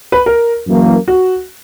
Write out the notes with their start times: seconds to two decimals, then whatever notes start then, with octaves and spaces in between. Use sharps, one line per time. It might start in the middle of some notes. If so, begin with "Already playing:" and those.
0.12 B4
0.26 A#4
0.68 F#2 E3 A#3
1.08 F#4